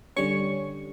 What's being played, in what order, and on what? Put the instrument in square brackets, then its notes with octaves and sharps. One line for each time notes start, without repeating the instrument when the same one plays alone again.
[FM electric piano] D3 G3 C#4 C#5 C#6